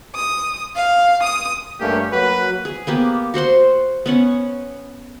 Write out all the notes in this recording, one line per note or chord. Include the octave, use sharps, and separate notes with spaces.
D#6
F5
D#6
G2 A3 A#3 C#4 G4
F#3 A#3 F#4 B4
G#4
A#3 B3 G4
F#4 C5 F#5 C6
B3 C#4 F#5